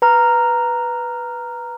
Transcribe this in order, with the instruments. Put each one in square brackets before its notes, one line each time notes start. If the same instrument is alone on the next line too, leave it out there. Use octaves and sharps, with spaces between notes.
[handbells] B4 A#5 F6